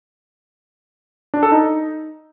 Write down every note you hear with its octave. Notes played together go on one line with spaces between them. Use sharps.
D4
A4
D#4